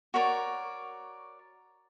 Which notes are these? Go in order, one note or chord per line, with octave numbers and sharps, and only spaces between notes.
F#4 A#4 C#5 D5